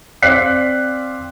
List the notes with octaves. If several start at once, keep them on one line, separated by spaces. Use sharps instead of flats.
C4 D5 F5 F#6 B6 C7